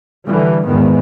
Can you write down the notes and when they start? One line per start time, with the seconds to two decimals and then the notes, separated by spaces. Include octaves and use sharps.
0.25 D3 E3 G3
0.64 E2 G#2 D#3 B3